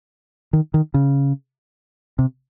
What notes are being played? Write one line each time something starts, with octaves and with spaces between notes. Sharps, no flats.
D#3
D#3
C#3
C3